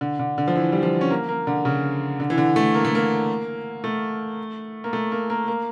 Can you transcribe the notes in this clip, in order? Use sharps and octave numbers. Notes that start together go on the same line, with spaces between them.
D3
D3
D3
F3
E3
G3
F3
C#4
A#3
A#3
D3
C#3
D3
E3
D3
A3
A#3
A3
A#3
A3
A#3
A3
A#3
A#3
A#3